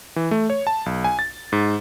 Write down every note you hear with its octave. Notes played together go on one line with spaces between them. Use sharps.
E3
A3
C#5
A5
B1
G#5
A6
G#2